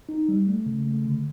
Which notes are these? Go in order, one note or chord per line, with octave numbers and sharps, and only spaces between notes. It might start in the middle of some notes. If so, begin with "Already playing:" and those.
D#4
G3
A3
C#3
A3
D3